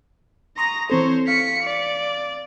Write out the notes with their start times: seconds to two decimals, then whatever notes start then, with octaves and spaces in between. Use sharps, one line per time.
0.58 A#5 C6 C#6 D#6 A#6
0.90 E3 C4 A4 C5 C#5
1.28 F5 B6 C#7
1.64 D5